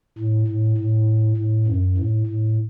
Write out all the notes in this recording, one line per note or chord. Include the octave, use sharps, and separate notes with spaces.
A2
A2
A2
A2
F#2
A2
A2